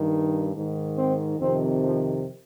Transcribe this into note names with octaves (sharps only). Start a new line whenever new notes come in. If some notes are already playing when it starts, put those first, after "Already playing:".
Already playing: G2 D#3
G#2 D#3
C4
F2 C3 D#3 C4
F3